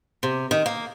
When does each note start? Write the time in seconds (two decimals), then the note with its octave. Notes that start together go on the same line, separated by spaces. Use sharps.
0.23 C3
0.51 D#3
0.66 A#3